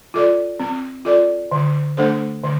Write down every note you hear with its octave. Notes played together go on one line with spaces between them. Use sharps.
F4 A4 D5
C4
F4 A4 D5
D3
A3 D4 A4 C5
D3